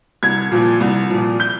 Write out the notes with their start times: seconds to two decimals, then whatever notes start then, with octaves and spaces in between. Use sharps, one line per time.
0.23 C2 G#6
0.52 A#2 F3
0.81 C2
1.10 A#2 F3
1.40 G6